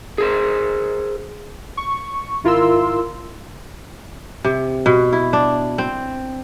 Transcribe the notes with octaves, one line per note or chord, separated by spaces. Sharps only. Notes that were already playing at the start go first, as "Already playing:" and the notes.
G#4 A#4 C5
C#6
G#1 E4 F4 A#4 C6 E6
C3
B2
E4
D4
C4